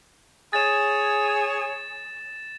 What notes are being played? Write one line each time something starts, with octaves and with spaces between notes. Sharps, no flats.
G#4 C#5 A6 E7